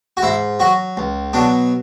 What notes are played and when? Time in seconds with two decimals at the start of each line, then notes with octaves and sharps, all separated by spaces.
0.17 F#4
0.22 G#2 E4
0.60 F#3 F#4
0.97 C#2
1.33 B2 F#3 D4